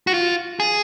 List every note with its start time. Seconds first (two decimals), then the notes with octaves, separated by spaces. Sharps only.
0.07 F#4
0.14 F4
0.60 G#4